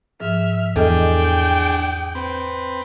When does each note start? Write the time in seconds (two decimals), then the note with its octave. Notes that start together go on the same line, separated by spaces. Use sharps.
0.20 G#2 F3 E5 F6
0.76 E2 D4 G#4 A4 D#5 G5
2.15 C4 B4